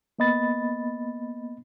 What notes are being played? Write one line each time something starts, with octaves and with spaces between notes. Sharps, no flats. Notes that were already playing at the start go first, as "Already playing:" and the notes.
A#3 B3 D#5 B5 A6